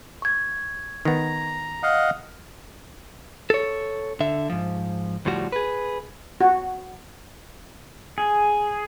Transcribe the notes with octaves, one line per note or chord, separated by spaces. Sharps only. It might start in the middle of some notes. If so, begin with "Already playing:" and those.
C#6 G#6
D#3 B3 A#5
D#5 F5 F#5
A4 C#5
D3 E5
G#2 F3
D2 A2 F3 G3 F#4
G#4 B4
F#4
G#4